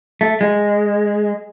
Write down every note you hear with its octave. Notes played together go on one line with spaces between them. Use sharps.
A3
G#3